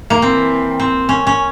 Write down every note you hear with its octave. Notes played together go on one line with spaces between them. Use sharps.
A#3
E3 C4
C4
C#4
C#4